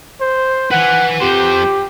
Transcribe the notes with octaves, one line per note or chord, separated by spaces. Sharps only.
C5
B4 F#5 G#5
F2 G4 C5